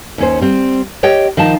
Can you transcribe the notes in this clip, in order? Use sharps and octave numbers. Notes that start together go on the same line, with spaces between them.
D#2 C#4 C5
G3 C4
G4 C#5 D#5 G5
D#3 F3 D#4 A5